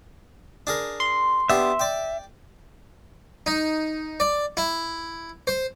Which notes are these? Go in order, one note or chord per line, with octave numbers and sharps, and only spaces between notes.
D4 G#4 A#4
C6
B3 D4 G4 E5
D5 G5
D#4
D5
E4
C5